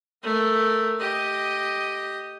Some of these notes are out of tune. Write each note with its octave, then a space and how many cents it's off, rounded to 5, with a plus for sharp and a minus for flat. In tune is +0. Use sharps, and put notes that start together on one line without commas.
A3 +0 A#4 +0
G4 +0 D#5 +0